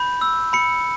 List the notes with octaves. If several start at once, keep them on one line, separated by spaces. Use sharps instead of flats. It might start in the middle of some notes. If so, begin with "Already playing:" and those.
Already playing: B5 G6
E6
B5 C#7